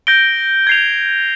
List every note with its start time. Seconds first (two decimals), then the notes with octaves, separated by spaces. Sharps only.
0.07 G6 A#6 D7 G7
0.67 G#6 C7 F7